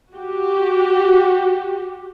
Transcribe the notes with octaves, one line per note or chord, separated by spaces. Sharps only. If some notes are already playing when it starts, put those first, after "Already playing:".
F#4 G4